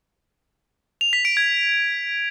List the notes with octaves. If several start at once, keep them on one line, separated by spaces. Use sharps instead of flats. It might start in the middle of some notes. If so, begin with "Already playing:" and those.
F7
B6
D7
G#6